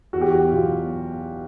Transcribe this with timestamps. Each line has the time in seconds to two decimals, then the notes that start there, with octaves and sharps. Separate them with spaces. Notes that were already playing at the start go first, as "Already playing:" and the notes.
0.13 E2 F#4
0.21 G4
0.30 F#4
0.51 B2 F#3 F4